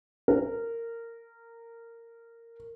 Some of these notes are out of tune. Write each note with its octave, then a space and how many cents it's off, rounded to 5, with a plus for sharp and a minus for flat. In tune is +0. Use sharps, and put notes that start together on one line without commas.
A#4 -15